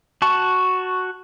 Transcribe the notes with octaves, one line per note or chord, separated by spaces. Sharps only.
F#4 A5 C#6